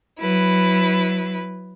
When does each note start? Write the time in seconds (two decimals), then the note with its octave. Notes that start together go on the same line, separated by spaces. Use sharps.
0.20 F#3 E4 B4